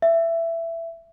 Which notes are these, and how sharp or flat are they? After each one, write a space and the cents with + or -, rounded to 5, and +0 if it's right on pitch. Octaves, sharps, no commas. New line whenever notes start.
E5 +15